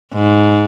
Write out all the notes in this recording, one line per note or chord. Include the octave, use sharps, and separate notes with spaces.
G#2